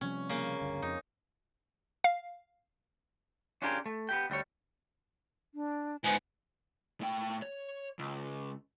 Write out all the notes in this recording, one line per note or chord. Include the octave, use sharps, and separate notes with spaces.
C3 F3 G3 C#4
C#3 A#3
D1 G2 D3
F2 D#4
F5
C#4 D4 F4 G4 G#4 A#4
A3
B3 G4 G5
D2 G3 G4 C#5
D4
G#2 B3 G#5
A2 G5
C#5
C#2